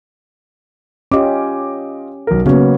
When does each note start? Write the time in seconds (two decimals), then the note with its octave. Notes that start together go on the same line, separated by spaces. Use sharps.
1.12 C#4 F4 G4 D#5 D6
2.27 B1 A#4
2.46 C#3 F#3 A#3 B3 C#4